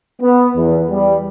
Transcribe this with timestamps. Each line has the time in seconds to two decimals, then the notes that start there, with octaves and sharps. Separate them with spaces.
0.22 B3
0.56 E2
0.90 G3